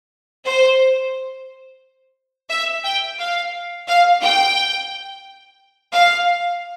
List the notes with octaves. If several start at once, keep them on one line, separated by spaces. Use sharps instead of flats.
C5
E5
G5
F5
F5
G5
F5